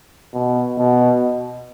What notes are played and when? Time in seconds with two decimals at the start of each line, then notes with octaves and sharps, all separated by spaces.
0.34 B2
0.78 B2